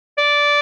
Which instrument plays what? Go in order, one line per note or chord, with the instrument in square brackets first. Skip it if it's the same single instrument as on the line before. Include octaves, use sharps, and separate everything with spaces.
[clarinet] D5